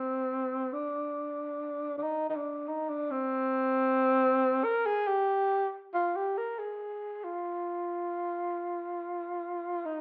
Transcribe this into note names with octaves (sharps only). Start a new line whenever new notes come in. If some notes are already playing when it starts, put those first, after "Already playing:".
Already playing: C4
D4
D4
D#4
D#4
D4
D#4
D4
C4
A#4
G#4
G4
F4
G4
A#4
G#4
F4
D#4